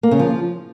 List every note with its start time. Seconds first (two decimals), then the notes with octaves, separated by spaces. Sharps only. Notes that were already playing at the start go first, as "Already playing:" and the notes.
0.03 A#3
0.11 C#3
0.19 F3